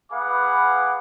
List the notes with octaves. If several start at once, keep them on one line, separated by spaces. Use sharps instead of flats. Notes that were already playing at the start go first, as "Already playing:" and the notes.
B3 G#4 B4 F5 F#5 D6